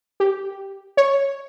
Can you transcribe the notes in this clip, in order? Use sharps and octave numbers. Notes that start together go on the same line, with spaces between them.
G4
C#5